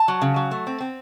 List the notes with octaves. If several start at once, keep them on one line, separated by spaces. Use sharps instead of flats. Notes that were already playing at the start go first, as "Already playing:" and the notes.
Already playing: A5
F#3
C#3
F#3
A3
C4
C4